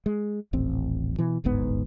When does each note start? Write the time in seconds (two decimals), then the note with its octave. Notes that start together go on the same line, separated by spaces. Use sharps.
0.06 G#3
0.53 D#1 A1 C4
1.19 B2 E3
1.44 D1 G1 G#2 B3